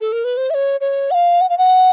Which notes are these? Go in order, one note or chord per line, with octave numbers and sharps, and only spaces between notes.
A4
A#4
B4
C5
E5
C#5
C#5
F#5
F5
F#5
F5
F#5